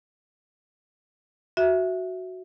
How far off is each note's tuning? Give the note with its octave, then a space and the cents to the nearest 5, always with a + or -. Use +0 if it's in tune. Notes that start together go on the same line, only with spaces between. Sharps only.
F#4 +0 E5 +0